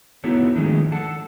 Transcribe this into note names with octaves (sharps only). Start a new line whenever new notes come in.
B3 D#4 E4 F#4 A4 C#5
D#3 F3 G#3 A3 D4
A4 F#5 A5